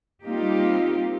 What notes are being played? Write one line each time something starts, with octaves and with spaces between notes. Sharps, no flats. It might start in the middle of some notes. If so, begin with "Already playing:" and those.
G3 A#3 C4 D#4 F4 G4